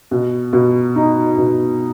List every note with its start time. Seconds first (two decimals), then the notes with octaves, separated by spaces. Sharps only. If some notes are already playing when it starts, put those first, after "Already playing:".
0.11 B2
0.53 B2
0.96 D#4
1.38 B2